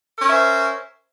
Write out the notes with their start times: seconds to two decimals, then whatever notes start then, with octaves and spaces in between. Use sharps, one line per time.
0.17 A#4
0.22 C#4
0.27 E5
0.32 C5